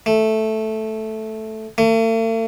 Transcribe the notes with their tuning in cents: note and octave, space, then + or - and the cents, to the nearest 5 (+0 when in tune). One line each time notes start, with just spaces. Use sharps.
A3 -5
A3 +45